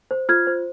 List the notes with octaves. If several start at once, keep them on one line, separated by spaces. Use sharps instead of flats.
C5
F4 F6 G#6
C5